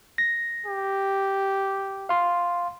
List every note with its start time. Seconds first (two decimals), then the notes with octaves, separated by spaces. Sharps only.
0.18 A#6
0.66 G4
2.09 F5 C6